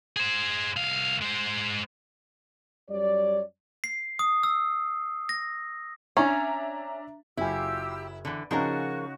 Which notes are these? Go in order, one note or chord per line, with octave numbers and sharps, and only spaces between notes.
G#4 C5
C2 F5
G#3 C5
F#2 G3 C#5 D5
C7
D#6
E6
A#6
C#4 D4 E5 A#5
F#1 F#3 E4 F4 G4 G#5 E6
D3 E3
C#3 F3 C#4 D#4 F#4 G#4 A#4 C#6